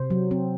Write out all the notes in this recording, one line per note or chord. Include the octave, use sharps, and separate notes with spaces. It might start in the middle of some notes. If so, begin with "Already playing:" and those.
Already playing: C3 C5
F#3
C4